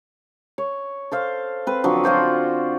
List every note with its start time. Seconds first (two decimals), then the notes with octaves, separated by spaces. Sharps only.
0.58 C#5
1.11 A4 C5 F5
1.67 C4 B4
1.84 D3 F3 F#3
2.04 F4 F#4 C5 D5